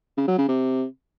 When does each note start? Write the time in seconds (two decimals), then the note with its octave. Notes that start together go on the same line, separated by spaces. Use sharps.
0.17 C#3
0.27 F#3
0.38 C#3
0.48 C3